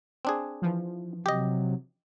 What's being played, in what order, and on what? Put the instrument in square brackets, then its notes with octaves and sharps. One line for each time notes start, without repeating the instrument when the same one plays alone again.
[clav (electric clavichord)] C4 D4 G#4
[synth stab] E3 F3
[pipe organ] C3 F#3 [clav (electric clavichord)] G4 D#5